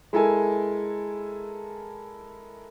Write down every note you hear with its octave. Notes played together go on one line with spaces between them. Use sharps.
G#3 E4 A4 A#4 G#5